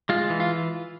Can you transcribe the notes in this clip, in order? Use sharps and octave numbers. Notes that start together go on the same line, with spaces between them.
G#3 F4
E3
F4